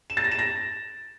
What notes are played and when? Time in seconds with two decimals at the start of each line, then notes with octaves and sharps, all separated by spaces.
0.10 E7
0.17 A6
0.24 A#6
0.31 E7
0.39 A#6